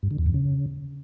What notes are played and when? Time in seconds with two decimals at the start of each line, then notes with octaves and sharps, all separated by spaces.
0.03 G2
0.11 D3
0.19 E2
0.26 F2
0.34 C#3